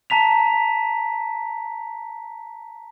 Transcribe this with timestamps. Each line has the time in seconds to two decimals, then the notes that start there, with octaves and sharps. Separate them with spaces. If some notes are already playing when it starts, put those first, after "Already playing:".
0.10 A5 A#5 B6 F7